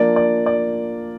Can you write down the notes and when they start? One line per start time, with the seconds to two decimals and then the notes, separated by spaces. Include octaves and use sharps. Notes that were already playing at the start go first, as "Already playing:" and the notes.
Already playing: F3 A#3 D4 D5
0.16 D5
0.46 D5